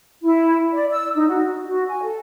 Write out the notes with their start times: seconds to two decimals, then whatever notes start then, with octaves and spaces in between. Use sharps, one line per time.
0.23 E4
0.73 D5
0.92 E6
1.15 D#4
1.29 F#4
1.66 F#4
1.88 G#5
2.03 A4